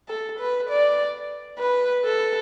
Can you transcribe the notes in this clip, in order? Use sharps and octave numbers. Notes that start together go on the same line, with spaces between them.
A4
B4
D5
B4
A4